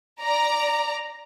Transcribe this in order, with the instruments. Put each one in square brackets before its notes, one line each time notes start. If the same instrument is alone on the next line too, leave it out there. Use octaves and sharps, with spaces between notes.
[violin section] D5 A#5